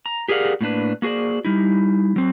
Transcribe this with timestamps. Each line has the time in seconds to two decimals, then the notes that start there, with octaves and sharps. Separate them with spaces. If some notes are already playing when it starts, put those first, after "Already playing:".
0.06 A#5
0.28 G4 G#4 A#4 D5 F5 F#5
0.61 A2 A#3 D4 B4
1.02 A#3 F#4 G#4 C5 D5
1.45 G3 D#4 E4
2.16 F#3 C4